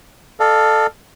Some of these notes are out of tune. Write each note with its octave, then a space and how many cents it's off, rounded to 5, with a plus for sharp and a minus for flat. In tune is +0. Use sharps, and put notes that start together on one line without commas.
A4 +0 D5 +45 F5 +0